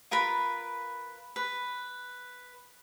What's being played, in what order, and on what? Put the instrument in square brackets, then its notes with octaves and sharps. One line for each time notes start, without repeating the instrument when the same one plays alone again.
[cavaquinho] F4 A#4 B4 B5
B4